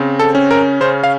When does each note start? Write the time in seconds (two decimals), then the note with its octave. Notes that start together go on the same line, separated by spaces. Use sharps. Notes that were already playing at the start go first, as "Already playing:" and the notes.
Already playing: C#3 C4
0.19 A4
0.35 C#4
0.51 A#4
0.81 C#3 C5
1.04 F5